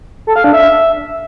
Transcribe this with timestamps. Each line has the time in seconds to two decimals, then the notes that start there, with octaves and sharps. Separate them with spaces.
0.27 A4
0.36 F5
0.44 D4
0.53 E5